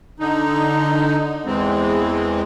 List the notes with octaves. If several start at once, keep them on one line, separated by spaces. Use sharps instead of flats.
D3 D#4
E2 E3 G#3 C4